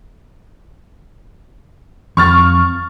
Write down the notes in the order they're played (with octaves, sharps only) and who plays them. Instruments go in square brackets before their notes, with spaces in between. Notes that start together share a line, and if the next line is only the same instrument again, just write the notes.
[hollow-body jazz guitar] F2 [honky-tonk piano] C#6 F6 A6